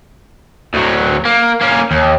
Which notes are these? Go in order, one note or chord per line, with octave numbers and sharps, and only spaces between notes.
D2 F#3
A#3
A#3 C#4
D#2